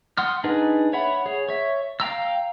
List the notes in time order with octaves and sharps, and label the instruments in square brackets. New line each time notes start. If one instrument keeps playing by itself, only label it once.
[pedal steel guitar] F#5 C6 D#6 F6
D4 D#4 G#4 B4
C#5 E5 F#5 B5
G#4 C#5
C#5 E5
F5 G5 A#5 E6